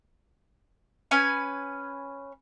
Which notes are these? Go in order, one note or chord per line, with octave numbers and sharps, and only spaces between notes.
C#4 B4 G#5